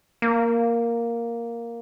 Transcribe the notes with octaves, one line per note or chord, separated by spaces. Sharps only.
A#3